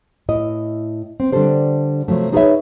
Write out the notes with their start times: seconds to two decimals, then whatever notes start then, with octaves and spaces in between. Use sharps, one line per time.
0.29 A2 E4 D#5
1.20 C4
1.32 D3 G3 D4 G4 A4 C5
2.08 C3 F3 F#3 A3
2.33 D#4 G#4 A4 B4 C#5 E5